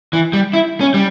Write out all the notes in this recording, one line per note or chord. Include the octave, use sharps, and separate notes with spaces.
E3
G3
E4
C#4
G3